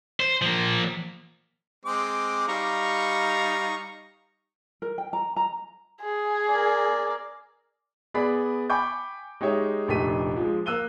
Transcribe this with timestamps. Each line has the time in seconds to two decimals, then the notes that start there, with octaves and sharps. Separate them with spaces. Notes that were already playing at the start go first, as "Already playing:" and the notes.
0.20 C5
0.42 F3 A#3
1.85 G#3 C4 D6
2.48 G3 D#4 F5 A#5 C#6
4.82 A#4
4.98 G5
5.13 A#5
5.36 A#5
6.02 G#4
6.48 A#4 D5
8.14 B3 G#4 D5 B5 B6
8.70 G5 G#5 B5 C#6 D6 G6
9.41 G#3 D#4 G4 C#5 E5
9.88 F1 A#1 A3 G4 B6 D#7
10.37 F3 G#3
10.66 A#3 E6 F#6 D#7 G7